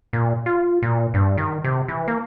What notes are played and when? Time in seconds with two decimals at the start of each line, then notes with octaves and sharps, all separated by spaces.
0.13 A#2
0.46 F4
0.82 A#2
1.14 G2
1.37 D#3
1.64 C3
1.88 E3
2.08 A#3